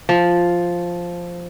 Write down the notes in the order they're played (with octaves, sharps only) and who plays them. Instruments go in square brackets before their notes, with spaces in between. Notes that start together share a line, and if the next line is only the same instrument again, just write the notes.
[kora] F3